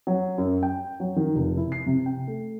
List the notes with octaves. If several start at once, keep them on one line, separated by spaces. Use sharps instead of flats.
F#3
F#2
G5
F#3
D#3
F1
E4
C7
C3
G5
A3